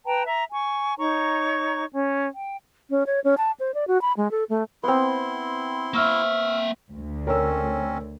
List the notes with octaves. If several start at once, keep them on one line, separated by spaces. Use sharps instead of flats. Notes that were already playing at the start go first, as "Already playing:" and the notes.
B4 G5 A5 A#5
E5 A#5
G#5 C#6
D#4 C#5 A#5 C#6
C#4
G5
C#4
C#5
C#4
A5
C5
D5
F#4
B5
G#3
A4
A3
B3 C4 E4 C6
A#3 E5 C#6 E6 F6
D2
C4 C#4 A#4 C#5 E6